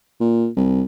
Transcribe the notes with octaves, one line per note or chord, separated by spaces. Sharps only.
A#2
C2